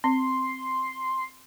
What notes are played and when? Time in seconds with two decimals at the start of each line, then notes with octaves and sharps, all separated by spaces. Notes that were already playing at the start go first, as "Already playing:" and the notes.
0.04 C4 C6